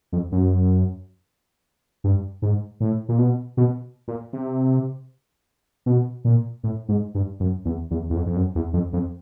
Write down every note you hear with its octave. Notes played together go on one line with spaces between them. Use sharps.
F2
F#2
G2
G#2
A2
A#2
B2
B2
A#2
C3
B2
A#2
A2
G#2
G2
F#2
E2
E2
E2
F2
F2
F#2
E2
F2
F2